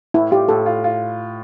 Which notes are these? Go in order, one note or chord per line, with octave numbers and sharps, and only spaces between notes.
A2 E4
F4 G4
A2 A4
F4
F4